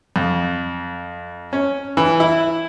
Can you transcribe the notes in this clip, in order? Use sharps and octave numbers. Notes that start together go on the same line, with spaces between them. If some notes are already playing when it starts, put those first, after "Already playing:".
F2
C#4
E3
E4